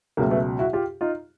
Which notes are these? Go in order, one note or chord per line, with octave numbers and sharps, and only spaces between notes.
C#2 B2 F#3 A3 A#3
A3 B3
E4 F#4
F4 G4
D#4 F4